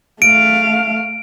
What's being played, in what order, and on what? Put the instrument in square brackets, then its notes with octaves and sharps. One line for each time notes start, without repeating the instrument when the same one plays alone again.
[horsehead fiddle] A3 F5 [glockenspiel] D7